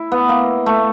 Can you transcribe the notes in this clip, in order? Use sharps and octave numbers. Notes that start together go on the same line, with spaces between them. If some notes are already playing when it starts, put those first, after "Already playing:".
Already playing: E4
B3
A#3
A3